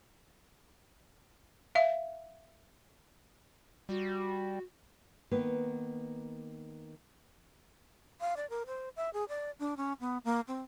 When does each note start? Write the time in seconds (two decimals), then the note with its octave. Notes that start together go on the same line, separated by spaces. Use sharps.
1.75 E5 F5
3.89 G3 F#4
5.31 D#3 A#3 B3 B4
8.21 F5
8.37 D5
8.50 A#4
8.67 C5
8.96 E5
9.13 G#4
9.29 D5
9.60 D4
9.77 C#4
10.00 B3
10.25 A#3
10.48 C4